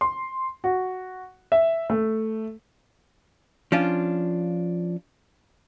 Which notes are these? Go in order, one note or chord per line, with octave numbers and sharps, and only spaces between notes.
C6
F#4
E5
A3
F3 C#4 D4 F4